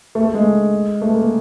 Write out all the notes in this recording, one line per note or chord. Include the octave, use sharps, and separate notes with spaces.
A3
A3
G#3
A3
A#3